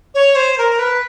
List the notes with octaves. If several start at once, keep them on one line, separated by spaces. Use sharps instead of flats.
C#5
C5
A#4
B4